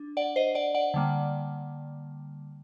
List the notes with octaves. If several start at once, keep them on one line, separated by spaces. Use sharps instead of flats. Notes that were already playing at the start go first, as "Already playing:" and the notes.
Already playing: D4
D5 F#5
C5 D#5
D5 F#5
D5 F#5
D3 G3 A#3